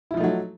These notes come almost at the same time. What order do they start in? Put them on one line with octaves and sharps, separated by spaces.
E4 F3 D#4 A3 F#3